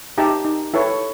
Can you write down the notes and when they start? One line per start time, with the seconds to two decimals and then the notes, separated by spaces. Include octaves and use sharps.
0.18 D#4 G4 E5 A5 A#5
0.45 D#4
0.74 E4 A4 B4 C#5